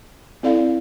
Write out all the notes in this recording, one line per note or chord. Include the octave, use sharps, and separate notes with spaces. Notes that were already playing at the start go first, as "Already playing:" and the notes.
C4 E4 A4 D5 F5